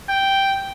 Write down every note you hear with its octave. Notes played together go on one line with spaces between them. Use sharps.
G5